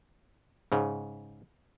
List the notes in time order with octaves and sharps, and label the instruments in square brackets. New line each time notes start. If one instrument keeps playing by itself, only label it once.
[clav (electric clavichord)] G#2 C#3